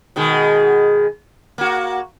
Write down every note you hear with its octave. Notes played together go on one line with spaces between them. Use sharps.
B2 D#3 G#3
A#3 F#4